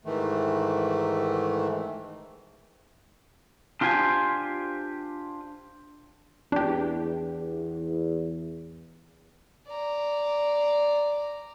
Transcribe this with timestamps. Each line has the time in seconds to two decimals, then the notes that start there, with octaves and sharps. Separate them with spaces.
0.05 G#2 D#3 E3 A3
3.81 D4 F4 G4 C5 G#5
6.52 E2 D4 G4
9.68 D5 A#5